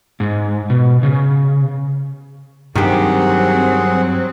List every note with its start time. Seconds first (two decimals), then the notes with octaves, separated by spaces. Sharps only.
0.20 G#2
0.70 B2
1.03 C#3
2.75 G2 D#3 F#3 C4 G4 G#4 F#5